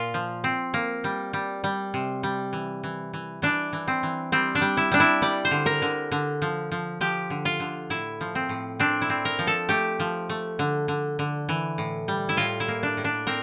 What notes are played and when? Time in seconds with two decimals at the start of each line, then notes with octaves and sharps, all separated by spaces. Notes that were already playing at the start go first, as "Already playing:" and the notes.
Already playing: A#2 F4
0.14 F3
0.44 C4
0.74 A#3
1.04 G3
1.33 G3
1.64 G3
1.94 C3
2.23 G3
2.53 E3
2.84 E3
3.13 E3
3.42 E3 D4
3.73 E3
3.88 C4
4.03 E3
4.32 G3 C4
4.55 D4
4.62 G3
4.77 E4
4.92 G3 D4
5.00 E4
5.22 G3 D5
5.45 C5
5.51 D3
5.66 A#4
5.82 D3
6.12 D3
6.42 F3
6.72 F3
7.01 F3 G4
7.30 D3
7.45 F4
7.60 D3
7.90 A2 E4
8.21 F3
8.35 C4
8.49 A2
8.80 C4 D4
9.01 E4
9.10 C4
9.25 A#4
9.39 F3
9.47 A4
9.69 A3 G4
10.00 F3
10.29 A3
10.59 D3
10.88 D3
11.19 D3
11.49 E3
11.78 A2
12.08 G3
12.29 E4
12.37 A2 F4
12.60 E4
12.68 A#3
12.83 D4
12.97 A2
13.04 D4
13.27 C4 A#4